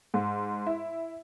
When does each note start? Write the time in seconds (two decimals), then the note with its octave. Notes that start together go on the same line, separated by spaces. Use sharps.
0.14 G#2
0.66 E4